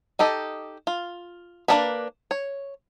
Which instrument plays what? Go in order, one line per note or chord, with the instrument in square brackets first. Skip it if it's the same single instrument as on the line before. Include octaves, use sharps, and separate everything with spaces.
[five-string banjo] D#4 G4 A4 D#5
F4
A#3 B3 D4 A#4 B4
C#5